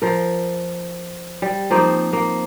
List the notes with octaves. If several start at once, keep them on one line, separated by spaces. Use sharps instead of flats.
F3 A#4
G3
F3 A#3 C4 D#4
A#3